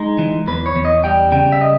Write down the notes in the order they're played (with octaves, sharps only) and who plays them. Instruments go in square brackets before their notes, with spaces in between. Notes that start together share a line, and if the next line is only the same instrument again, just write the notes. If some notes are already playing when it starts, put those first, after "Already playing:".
Already playing: [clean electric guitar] G#3 D#4
E3
E2 B4
C#5
E2
D#5
G3 G5
C#3 G5
E5
D#5